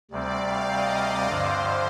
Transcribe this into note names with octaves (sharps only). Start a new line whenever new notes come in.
D2 C3 G3 C4 D5
F5
D#5
D5
G2 D3 F3 C5